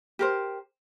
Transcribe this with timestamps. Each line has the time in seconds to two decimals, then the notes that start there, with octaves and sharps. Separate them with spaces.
0.19 G4 A#4 C5